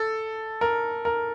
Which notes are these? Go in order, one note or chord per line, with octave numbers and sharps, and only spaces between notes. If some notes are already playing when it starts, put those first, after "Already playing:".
Already playing: A4
A#4
A#4